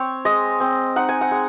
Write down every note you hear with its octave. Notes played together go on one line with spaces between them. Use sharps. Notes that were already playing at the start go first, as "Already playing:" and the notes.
Already playing: C4 C#5
G#3 D#5
C4
D#4 F#5
G#5
F#5
G#3